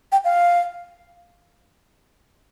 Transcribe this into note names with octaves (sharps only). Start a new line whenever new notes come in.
G5
F5